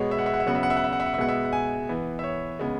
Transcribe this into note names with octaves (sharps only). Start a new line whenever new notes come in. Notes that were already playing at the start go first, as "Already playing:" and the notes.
Already playing: B2 G#3 B3 C#5
E5
F#5
E5
F#5
E5
C#3 F#3 B3 F#5
E5
F#5
E5
F#5
E5
F#5
E5
F#5
E5
B2 G#3 B3 F#5
E5
F#5
G#5
E3 B3
E5
C#5
C#3 G#3 B3